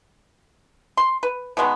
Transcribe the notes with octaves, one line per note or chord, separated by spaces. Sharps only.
C6
B4
B2 D#3 G#3 B3